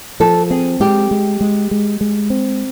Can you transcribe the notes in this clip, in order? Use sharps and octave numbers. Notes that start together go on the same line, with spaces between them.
F3 A4
C4 G#4
G#3 G4
G#3
G#3
G#3
G#3
C4